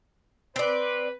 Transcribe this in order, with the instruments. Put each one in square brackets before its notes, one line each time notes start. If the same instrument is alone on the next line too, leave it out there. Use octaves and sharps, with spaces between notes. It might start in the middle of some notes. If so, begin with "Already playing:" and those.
[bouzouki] C4 D5 [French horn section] B4